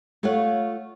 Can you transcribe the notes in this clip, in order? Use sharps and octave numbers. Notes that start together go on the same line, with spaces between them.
A3 F4 C#5 F5 F#5